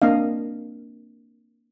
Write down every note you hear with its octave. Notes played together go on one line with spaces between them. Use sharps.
A#3 C4 D4 D#5 F5